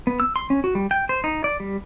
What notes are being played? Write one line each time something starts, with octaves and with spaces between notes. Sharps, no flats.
B3
E6
C6
C#4
F#4
G3
G5
C5
D#4
D5
G3